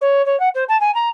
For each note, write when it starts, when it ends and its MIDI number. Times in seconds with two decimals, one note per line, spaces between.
0.01 0.24 73
0.25 0.38 73
0.39 0.49 78
0.54 0.64 72
0.68 0.79 81
0.80 0.93 80
0.94 1.08 82